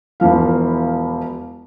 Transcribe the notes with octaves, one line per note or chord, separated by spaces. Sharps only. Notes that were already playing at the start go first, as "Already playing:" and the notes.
E1 E3 F3 F5